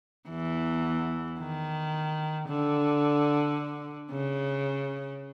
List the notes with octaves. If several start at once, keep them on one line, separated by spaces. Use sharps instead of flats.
E2 E3
D#3
D3
C#3